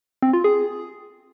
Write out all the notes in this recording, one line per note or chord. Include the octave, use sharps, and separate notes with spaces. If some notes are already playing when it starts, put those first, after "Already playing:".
C4
F4
G#4